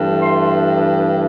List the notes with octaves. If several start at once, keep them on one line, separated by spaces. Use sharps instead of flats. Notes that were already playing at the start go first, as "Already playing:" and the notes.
Already playing: G2 E3 A3
C6